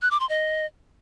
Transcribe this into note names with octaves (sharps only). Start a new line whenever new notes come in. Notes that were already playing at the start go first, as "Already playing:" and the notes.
F#6
D6
C6
D#5